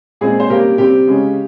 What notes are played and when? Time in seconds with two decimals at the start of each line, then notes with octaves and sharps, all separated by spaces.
0.21 A#2 G#3 C4 G#4
0.40 C5
0.50 C3 G3 A#3 C#4 G4 A#4
0.78 C3 G3 C4 G4
1.07 C#3 G#3 C#4